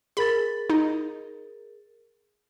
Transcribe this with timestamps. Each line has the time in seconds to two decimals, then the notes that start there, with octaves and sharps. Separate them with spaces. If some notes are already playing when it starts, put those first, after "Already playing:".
0.17 G#4 A#4 B5 A6
0.70 D#4